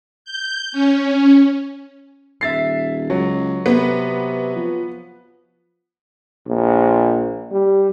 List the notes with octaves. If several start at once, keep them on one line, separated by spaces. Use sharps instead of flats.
G6
C#4
D#1 E5 A6 C7
C#2 F#3
C3 B3
F3
A#1
G3